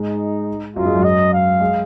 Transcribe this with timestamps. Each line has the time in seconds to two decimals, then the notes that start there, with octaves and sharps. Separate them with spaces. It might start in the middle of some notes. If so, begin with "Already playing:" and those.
Already playing: G#2 G#3 D#4
0.76 F#2 F#3 F4
0.85 G#2 G#3
0.95 F#2 F#3
1.04 D#5
1.33 F5
1.60 G#3